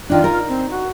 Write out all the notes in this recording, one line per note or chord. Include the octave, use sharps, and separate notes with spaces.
D#3 D4 F4
D#4 A#4
C4
F#4